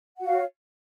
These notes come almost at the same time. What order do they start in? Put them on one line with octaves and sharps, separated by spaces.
F#5 F#4 F5 C#5